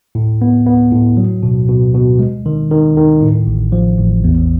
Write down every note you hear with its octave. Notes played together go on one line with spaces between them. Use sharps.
A2
B3
B3
A2
F#3
B2
B2
B2
G#3
D#3
D#3
D#3
A2
A1
F3
A1
E2